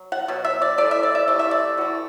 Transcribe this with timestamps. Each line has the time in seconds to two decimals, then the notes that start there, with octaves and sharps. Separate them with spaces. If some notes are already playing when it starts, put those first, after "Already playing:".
Already playing: F#3
0.12 F#5
0.28 B2 F#3
0.45 E5
0.62 D5
0.78 E3 A3 D5
0.91 E5
1.03 D5
1.15 E5
1.28 C3 E3 A3 D5
1.39 E5
1.51 D5
1.77 E3 A3 F#4